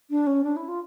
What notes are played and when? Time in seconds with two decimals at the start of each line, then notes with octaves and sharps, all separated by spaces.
0.10 D4
0.26 C#4
0.43 D4
0.56 E4
0.68 F4